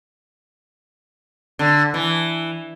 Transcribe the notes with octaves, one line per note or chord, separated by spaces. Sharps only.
D3
E3